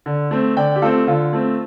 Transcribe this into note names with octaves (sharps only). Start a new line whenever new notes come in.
D3
A3 C4
D3 D5 G5
G4
A3 C4 F4 A4
D3 F4
A3 C4